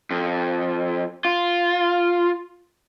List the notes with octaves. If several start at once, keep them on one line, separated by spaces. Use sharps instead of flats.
F2
F4